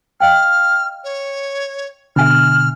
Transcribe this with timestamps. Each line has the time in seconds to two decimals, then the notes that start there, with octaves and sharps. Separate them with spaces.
0.20 D#5 F5 G5 F6
1.04 C#5
2.16 B2 D3 E5 G#5 B5 F6